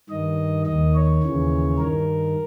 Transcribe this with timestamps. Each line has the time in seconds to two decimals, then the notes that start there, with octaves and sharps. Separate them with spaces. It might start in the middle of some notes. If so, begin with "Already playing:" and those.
0.09 G2 D#3 D#5
0.66 D#2 D#3 D#5
0.95 C#5
1.23 D#2 C#3 E3
1.78 G2 D#3 A#4